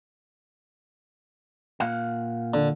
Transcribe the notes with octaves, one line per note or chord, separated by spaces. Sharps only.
A#2 F5 F#5
D3